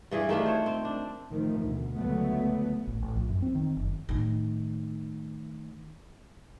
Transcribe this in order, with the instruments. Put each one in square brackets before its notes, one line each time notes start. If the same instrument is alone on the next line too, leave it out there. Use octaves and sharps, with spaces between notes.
[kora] G2 E3 G#4 D5
D#3 A3 D4 F4
C5 C#5
C4
D4
[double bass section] D#3 F3 A3
D2 B2
C#2 D3 F#3 A3 B3
[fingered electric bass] A1
A1
A#1
F#2
C4
D#3
F#1
[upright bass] A2 D#3